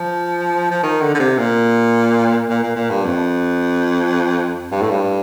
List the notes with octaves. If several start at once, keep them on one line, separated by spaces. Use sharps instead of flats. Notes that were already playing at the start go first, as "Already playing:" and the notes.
Already playing: F3
F3
D#3
D3
D3
C3
A#2
A#2
A#2
A#2
G2
F2
G2
A2
G2